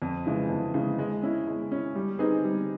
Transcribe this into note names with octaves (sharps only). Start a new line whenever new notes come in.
F2
C#3 E3 G#3
F2
C#3 E3 G#3
G#3
C#4 E4
G#3
C#4 E4
G3
C4 D#4 G#4 B4
G3